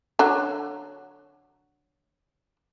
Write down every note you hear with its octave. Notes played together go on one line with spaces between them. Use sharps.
D3 F#3